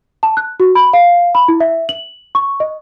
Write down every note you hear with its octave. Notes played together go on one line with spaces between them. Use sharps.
A5
F#6
F#4
B5
F5
B5
E4
E5
F#7
C#6
D#5